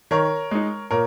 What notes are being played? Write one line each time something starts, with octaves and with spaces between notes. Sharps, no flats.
D#3 A#4 C#5
G#3 D#4
A#2 A#4 C#5